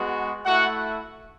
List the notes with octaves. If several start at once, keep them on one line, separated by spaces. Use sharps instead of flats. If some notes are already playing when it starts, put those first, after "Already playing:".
Already playing: G#3 B3 F#4
A3 E4 F#4 F#5